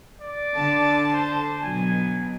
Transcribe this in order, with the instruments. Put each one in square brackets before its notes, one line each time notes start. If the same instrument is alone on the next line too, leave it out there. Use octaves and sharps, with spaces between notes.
[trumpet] D5
[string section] D3 A5
[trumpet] C5
[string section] B2 F#3 [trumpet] G#5